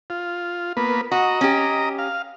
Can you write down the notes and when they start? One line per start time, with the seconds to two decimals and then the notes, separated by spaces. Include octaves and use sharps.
0.10 F4
0.77 A#3 B3 B4
1.11 F#4 D#5 A#5
1.41 C#4 G4
1.98 F5